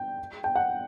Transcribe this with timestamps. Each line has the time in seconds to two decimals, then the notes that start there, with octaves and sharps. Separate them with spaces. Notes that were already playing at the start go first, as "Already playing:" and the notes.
Already playing: G5
0.44 G5
0.56 F#5